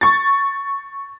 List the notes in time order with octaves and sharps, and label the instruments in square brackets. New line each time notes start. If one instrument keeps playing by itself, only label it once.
[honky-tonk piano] C#6 A6